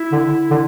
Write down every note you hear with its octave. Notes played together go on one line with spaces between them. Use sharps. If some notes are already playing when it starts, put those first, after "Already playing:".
Already playing: E4
D3
D3